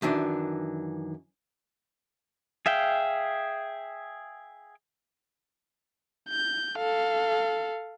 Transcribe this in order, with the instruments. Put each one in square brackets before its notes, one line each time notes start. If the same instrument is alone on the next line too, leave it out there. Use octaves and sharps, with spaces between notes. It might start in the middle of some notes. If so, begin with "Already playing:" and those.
[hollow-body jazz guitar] F#2 D#3 E3 D4
[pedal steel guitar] G#4 E5 F5 G5
[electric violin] G6
A4 F5